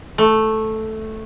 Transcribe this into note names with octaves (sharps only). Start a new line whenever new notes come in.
A3